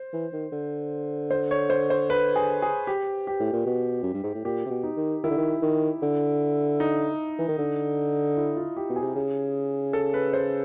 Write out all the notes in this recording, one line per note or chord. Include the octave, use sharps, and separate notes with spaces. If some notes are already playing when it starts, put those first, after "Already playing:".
Already playing: C5
E3
D#3
D3
C5
C#5
C5
C5
B4
G#4
G#4
G4
G4
A2
A#2
B2
F#2
G2
G#2
A2
A#2 G4
C3
B2
D#4
D#3
D#3 E4
D3
D#3
D#3
D3
D#4
E3
D#3
D3
E4
F4
G4
B2
G#4
C3
C#3
A4
B4
C5